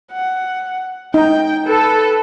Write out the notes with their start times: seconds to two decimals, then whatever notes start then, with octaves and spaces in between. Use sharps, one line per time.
0.13 F#5
1.14 D#4 G5
1.67 A4 B4